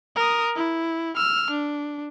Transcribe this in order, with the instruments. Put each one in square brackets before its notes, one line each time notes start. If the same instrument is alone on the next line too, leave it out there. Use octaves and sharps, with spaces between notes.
[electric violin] A#4 D#6
E4
E6 F6
D4